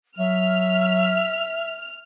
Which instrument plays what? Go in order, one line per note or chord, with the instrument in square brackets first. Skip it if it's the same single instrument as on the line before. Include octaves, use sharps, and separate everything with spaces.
[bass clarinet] F#3 [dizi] E5 [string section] F6